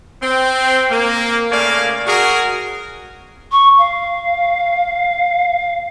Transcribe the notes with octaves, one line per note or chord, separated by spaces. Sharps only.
C4
A#3
C#3 A3 A#3 D5 F5 G#5
F#4 G#4 A#4
C#6
F5